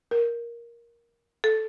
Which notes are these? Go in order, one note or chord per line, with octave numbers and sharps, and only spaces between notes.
A#4
A4